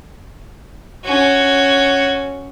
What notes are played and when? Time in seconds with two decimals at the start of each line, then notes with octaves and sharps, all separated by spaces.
1.04 C#4 F#4